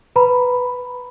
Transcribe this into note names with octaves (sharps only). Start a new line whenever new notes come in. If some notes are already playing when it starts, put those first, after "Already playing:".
B4 A#5 B5